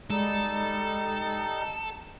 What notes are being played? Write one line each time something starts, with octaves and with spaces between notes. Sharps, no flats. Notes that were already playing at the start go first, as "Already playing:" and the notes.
G3 G#3 D#4 A4